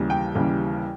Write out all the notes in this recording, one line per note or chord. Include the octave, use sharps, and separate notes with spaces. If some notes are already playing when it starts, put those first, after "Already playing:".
Already playing: D#2 C#3 E3 G3
G5
D#2 C#3 E3 G3